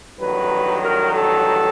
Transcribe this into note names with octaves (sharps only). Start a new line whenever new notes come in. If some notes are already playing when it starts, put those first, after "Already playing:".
A1 G2 D#3 F#3 B4
A#4
A4